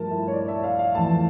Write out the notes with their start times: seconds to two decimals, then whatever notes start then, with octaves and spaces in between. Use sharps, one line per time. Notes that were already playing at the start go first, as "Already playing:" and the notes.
Already playing: G2 F3 A3 A#4 A5
0.11 E4
0.28 C#5
0.33 D5
0.48 E5
0.63 F5
0.79 F5
0.95 F2 E3 A3 A5